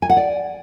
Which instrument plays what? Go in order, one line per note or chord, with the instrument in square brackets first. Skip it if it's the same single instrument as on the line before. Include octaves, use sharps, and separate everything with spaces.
[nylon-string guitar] G#5
F#5
D5